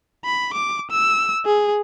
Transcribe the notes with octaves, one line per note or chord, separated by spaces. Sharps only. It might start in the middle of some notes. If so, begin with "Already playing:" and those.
B5
D6
E6
G#4